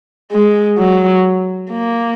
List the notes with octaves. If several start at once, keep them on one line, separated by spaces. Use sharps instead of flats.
G#3
F#3
A#3